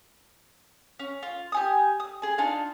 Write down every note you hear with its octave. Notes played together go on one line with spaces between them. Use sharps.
C#4
F4
G4 G#5 D#6
D#6
G#4 G#5
D4 D#4 F4 F5